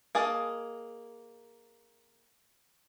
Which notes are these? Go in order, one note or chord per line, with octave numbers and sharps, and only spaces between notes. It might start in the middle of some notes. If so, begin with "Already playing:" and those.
A#3 G#4 D#5 A5